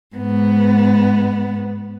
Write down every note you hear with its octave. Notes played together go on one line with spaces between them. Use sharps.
G#2 B3